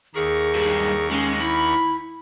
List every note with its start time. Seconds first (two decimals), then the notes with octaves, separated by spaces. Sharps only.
0.15 D#2 G#4 A#4 C#6
0.55 G2 G#3
1.11 G#3 C#4
1.41 E4 B5